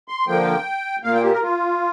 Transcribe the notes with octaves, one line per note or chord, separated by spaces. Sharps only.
C6
D3 F3 A#3 G5
A#2 A#3 F5
G5
G4
A#4
F4